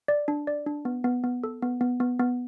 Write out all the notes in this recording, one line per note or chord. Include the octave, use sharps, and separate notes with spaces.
D5
D4
D5
D4
B3
B3
B3
A4
B3
B3
B3
B3